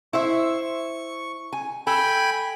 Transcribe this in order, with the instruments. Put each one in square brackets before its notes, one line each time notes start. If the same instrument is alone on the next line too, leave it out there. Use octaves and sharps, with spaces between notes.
[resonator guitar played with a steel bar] E4 C5 E5 [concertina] C#6
[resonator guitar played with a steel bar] G#5
[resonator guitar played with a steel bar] A4 [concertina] G5 G#5 B5